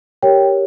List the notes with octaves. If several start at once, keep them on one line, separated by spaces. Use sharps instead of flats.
G4 A#4 C#5 G5